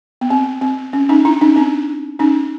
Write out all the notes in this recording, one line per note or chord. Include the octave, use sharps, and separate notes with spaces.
B3
C4
C4
C#4
C#4 D#4
D4 E4
C#4 D#4
C4 D4
C#4 D#4